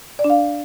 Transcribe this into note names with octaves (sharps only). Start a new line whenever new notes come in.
D5
D4
F5